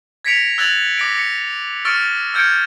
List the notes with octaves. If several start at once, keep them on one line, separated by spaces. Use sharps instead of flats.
G#6 A#6 B6 C#7 D7 F7
E6 F#6 G#6 A6 F7 F#7
D6 A#6 D7
C#7
C#6 E6 F6 A6 C#7 D7
E6 F6 G6 G#6 C#7 D7